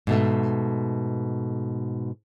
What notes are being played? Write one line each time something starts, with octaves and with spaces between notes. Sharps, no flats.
G#2 B2 A3